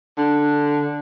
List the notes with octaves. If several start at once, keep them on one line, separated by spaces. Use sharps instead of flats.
D3